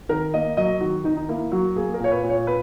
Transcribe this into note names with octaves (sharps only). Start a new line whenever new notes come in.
D#3 A#4
A#3 D#5
F#3 D#5
D#3 F#4
D#3 D#4
D#4
A#3 E4
F#3 F#4
A#3 G#4
A#4
A#2 C#5
B4
A#2
C#5
B4